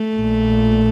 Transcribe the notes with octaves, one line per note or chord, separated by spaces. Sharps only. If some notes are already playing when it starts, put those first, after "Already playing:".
Already playing: A3
A#1 A#2